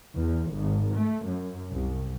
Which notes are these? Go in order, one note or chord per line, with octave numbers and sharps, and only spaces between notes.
E2
G#1
A3
F#2
C2